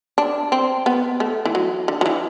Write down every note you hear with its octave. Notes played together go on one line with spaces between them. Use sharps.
D4
C4
B3
A3
E3
F#3
D3
F#3
E3